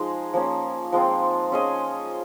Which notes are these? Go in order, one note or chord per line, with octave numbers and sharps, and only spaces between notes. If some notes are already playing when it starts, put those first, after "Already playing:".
Already playing: F3 G#3 D#4 G#4
F3 A#3 C#4
F3 G#3 C4 F4
C#4 G#4 D#5